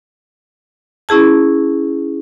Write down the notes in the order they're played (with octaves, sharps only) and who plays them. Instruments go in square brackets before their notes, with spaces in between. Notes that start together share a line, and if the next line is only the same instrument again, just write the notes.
[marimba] C#4 E4 G#4 A5